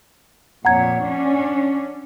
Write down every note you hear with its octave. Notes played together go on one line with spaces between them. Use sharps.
F2 A#2 C#5 F#5 A#5 G#6
C#4 D4